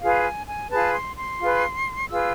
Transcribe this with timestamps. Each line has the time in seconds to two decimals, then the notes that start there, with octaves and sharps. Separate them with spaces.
0.01 F4 G#4 B4 F5
0.24 G#5
0.48 G#5
0.70 F4 G#4 B4 A5
0.94 C6
1.16 C6
1.40 F4 G#4 B4
2.09 F4 G#4 B4 E6